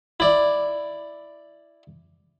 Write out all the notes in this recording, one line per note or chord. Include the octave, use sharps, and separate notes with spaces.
E4 D5